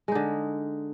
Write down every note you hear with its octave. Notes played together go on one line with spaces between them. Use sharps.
D3 G#3 D#4